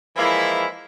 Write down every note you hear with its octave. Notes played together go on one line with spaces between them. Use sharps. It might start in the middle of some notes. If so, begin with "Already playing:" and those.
E3 F3 G#3 A#3 E4